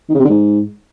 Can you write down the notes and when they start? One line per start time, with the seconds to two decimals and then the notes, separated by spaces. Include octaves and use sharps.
0.10 D#3
0.15 C#3
0.20 C3
0.25 D3
0.30 G#2